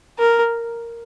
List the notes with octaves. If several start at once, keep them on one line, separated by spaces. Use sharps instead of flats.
A#4